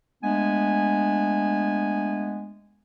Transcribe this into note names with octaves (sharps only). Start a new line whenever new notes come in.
G#3 A3 B3 D4 G#5